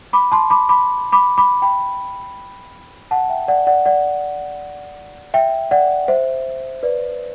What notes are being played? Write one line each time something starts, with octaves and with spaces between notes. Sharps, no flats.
B5 D6
A5 C6
B5 D6
B5 D6
B5 D6
B5 D6
G5 B5
F#5 A5
E5 G5
D5 F#5
D5 F#5
D5 F#5
E5 G5
D5 F#5
C5 E5
B4 D5